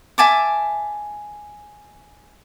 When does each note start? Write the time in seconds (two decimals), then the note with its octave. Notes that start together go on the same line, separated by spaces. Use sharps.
0.18 E5 G#5 A5 D6